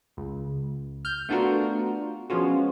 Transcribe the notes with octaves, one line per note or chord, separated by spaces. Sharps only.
C#2
F6 G6
A3 B3 D4 F4 F#4 A#4
F3 G#3 B3 C#4 F4 F#4